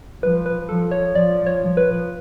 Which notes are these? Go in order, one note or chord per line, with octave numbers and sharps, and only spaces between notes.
F3 B4
B4
F3 A4
C#5
F3 D5
C#5
F3
B4